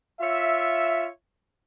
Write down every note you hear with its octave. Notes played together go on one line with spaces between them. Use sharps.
F4 C#5 E5